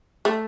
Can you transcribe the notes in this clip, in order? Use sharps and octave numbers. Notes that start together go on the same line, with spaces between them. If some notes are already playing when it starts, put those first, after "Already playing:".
A3